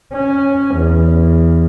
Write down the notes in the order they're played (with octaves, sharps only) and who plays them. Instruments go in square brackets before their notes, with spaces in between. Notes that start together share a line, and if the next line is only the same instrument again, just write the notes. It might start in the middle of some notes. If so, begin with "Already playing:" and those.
[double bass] C#4
E2